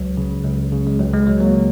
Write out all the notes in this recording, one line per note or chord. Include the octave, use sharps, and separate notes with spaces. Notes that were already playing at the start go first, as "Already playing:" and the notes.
Already playing: C#2 F#3
C#3
C#2
C#3
G#3
C#2 F#3
G#3
C#3 F#3
F#3 A#3